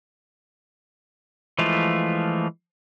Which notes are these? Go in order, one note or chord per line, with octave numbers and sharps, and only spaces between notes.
E3 F3 G#3 A3 F4